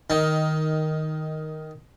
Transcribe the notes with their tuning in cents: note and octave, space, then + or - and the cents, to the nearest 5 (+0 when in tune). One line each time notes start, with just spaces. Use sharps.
D#3 +0 D#4 +15